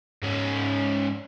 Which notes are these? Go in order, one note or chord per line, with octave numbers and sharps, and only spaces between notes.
G#2 C#4